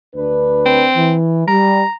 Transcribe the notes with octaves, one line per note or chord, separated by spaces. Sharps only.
D2 D4 B4
C4
E3
G3 A#5